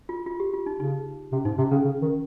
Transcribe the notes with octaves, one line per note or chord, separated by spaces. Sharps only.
F4
F4
G4
F4
D#4
C#3 D#4
C3 C#4
G#2 D#4
C3 C#4
C#3 C#4
C#3
D#3